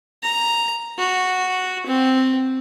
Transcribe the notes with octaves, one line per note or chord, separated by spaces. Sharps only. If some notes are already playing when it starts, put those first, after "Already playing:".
A#5
F#4
C4